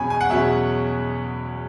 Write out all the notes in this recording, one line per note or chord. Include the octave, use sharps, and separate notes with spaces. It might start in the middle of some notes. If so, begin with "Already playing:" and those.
Already playing: E2 B2 F#3 C#4 G#5 B5
G#5
F#5
E2 B2 F#3 C#4 E5